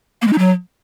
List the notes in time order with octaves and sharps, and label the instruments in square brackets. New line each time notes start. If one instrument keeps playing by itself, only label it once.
[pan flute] A#3
G#3
D#4
F#3